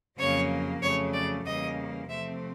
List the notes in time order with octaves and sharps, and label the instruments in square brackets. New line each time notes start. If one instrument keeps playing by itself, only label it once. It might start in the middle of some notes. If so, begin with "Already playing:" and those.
[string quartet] F2 C#3 F#3 A#3 C#5
F2 C#3 F#3 A3 C#5
D5
E2 C#3 E3 G3 A#3 D#5
C3 F3 A3 C4 E5